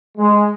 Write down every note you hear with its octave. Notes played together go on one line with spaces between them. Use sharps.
G#3